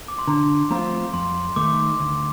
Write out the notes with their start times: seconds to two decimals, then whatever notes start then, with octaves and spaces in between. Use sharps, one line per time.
0.08 D6
0.19 C6
0.28 D3 A#5
0.70 F3 A3 C4 F4 A#5
1.14 F2 C6
1.56 D#3 A3 D#4 D6
2.00 D2